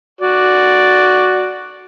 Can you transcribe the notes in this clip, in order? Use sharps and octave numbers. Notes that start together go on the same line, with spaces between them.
F#4 D5